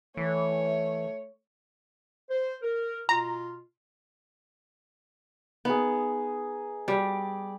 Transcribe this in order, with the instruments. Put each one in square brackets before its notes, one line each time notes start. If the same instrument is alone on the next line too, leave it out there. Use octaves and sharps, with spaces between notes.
[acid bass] E3 [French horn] A3 [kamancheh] C#5
[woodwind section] C5
A#4
[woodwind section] B2 F4 [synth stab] A#5
[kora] B3 [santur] D#4 G#4
[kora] G3 [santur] D5